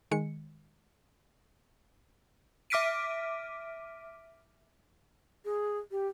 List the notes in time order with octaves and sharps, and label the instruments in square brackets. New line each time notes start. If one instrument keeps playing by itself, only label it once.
[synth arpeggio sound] D#3 G#3 C#7
[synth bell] E5 D6 F6 B6 D7 D#7
[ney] G#4
G4